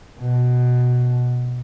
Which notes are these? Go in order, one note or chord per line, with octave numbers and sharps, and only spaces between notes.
B2